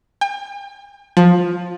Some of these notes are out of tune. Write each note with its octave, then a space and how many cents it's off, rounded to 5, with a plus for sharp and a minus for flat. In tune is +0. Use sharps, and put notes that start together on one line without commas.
G5 +45
F3 +15